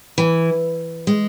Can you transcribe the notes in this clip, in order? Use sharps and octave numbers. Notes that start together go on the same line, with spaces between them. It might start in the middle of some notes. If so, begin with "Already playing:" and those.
E3
G#3